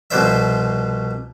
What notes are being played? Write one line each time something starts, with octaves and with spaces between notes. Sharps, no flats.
C2 B2 F3 C5 D5 E5